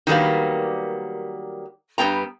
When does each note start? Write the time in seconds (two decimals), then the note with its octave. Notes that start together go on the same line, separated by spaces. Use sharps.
0.07 D#3 F#3 G3 A#3 B3
1.98 G2 G3 B3 G5 A#5